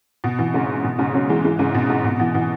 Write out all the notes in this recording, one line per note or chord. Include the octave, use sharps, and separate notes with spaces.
B2
B2 E3
G#2 C#3
B2
G#2 C#3
C#3 F#3
E3 G#3
E3 G#3
G#2 C#3
B2
G#2
B2
B2 E3
B2 E3